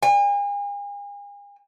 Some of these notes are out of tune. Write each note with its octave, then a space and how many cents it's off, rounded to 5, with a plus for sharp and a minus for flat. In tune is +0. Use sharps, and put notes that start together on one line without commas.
G#5 -40